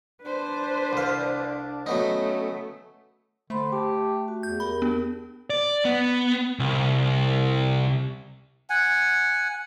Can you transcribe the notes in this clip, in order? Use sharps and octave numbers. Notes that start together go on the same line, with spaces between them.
D4 B4 C5
C2 F5
F#3 A3 B3 C#4 D#4
D3 A3 C5 B5 C6
G4 A5
F#4
E2 G6
G4 A#4 B5
B3 D4
D5
B3
C2
F#5 G#5